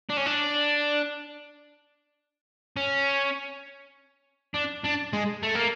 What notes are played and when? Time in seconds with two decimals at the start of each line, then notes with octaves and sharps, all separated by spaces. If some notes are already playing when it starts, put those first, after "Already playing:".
0.09 D4
0.17 C#4
0.26 D4
2.77 C#4
4.54 D4
4.84 D4
5.13 G#3
5.43 A3
5.55 A#3